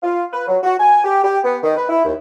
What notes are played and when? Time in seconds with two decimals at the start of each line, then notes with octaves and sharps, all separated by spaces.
0.03 F4
0.33 B4
0.47 F#3
0.63 F#4
0.80 G#5
1.04 G4
1.23 G4
1.44 B3
1.63 D#3
1.77 B4
1.89 E4
2.05 D#2